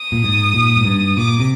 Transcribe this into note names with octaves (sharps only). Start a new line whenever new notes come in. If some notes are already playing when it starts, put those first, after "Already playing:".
Already playing: D#6
A#2
G#2
A#2
G#2
G2
A#2 D6
C3